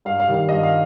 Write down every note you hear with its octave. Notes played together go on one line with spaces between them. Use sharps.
G2 F5
F5
D#3 G3
F5
G2 D#5
F5